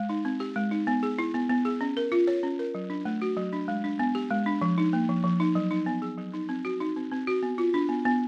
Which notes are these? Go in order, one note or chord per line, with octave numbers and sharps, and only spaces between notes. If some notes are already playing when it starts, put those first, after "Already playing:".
Already playing: G#3
D#4
C4
G4
G#3
D#4
B3
G#4
E4
B3
B3
G#4
C#4
A#4
F4
C#5
C#4
A#4
F#3
D4
A3
F#4
F#3
D4
G#3
D4
B3
G4
G#3
D4
F3
D#4
A#3
F3
F3
D#4
F#3
D#4
B3
G#4
F#3
D#4
C4
F#4
D#4
C4
C4
F#4
B3
F4
D4
B3
B3